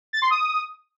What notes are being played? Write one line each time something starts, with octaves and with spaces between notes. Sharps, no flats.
A6
C6
D#6